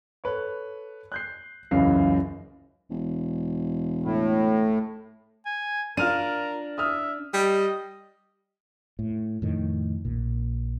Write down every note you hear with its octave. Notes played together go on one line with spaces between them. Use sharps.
A4 B4 C#5
F#6 G6 C7
F#1 C#2 F#2 E3 F5 C7
E1
A2
G#5
D4 F4 A#4 F6 D#7
E5 D#6 F6
G3 D#5
A2
F2 A2 D#3
A#1 A#2